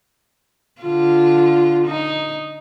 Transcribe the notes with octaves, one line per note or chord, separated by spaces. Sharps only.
D3 F4
D#4